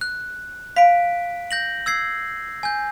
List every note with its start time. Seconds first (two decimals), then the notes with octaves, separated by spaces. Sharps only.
0.01 F#6
0.76 F5 B6 D7
1.51 G6 A#6 F#7
1.86 E6 G#6 C7
2.63 G#5 G6